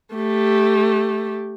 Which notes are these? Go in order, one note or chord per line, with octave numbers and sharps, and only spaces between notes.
A3 G4